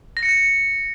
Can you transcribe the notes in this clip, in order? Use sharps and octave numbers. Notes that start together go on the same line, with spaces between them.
A#6
C#7
A#6